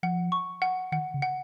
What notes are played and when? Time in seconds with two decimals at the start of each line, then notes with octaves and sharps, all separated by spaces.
0.03 F3 F#5
0.32 C#6
0.62 F#5
0.92 D#3 F#5
1.14 C#3
1.22 F#5